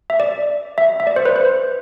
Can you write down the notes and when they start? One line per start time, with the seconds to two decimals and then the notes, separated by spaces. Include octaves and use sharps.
0.10 E5
0.20 D5
0.78 E5
1.00 E5
1.07 D5
1.16 C5
1.25 B4
1.36 C5